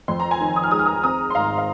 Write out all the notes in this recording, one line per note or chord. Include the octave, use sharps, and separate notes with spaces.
F2 C6
A#5
G#5 C6
D#3
D#6
F6
G#3 D#6
F6
A#5 D#6
C4 A#5 D#6
C6
G#1 F5 A#5
F5